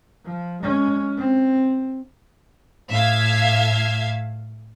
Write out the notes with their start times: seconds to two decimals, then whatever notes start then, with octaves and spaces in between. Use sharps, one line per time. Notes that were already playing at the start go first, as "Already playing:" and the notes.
0.25 F3
0.62 G#3 C#4
1.17 C4
2.90 A2 E5 F5 G#6